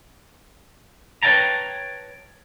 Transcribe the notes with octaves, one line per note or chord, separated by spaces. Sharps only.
B4 C#5 D#5 G5 A5 A#5